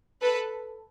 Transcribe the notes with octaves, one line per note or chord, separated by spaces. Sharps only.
A4 B4